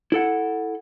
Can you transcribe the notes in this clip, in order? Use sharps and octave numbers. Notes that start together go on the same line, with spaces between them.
E4 A4 F#5